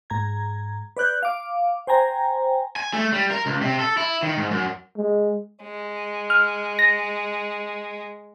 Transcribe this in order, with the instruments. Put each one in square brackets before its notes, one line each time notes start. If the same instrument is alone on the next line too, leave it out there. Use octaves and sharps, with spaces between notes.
[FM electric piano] G#2 A#5 G#6
B4 D5 F#6 G6
F5 D6
C5 G5 G#5 A#5
[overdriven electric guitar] G#5
A3
G3
A#4
C#2
C3
A4
E4
D#3
G#2
F#2
[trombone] G#3
[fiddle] G#3
[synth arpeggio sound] F6
A#6